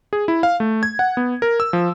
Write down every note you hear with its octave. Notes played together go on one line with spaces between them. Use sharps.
G#4
E4
F5
A3
G#6
F#5
B3
A#4
E6
F3